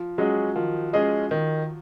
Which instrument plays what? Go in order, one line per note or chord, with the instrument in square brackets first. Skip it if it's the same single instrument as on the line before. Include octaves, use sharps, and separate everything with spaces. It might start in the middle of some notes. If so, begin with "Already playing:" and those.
Already playing: [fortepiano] F3
[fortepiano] F#3 [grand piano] G#3 C#4 G#4 D#5
[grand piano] D#3 [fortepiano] F3
[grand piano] G#3 C#4 G#4 D#5
D#3